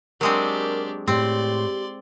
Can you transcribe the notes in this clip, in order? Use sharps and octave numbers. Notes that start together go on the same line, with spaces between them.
F#3 G#3 C4 D4 G4 A#4
A2 C4 G4 D5 C6